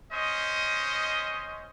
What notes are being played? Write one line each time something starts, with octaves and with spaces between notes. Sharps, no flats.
C#4 C5 D#5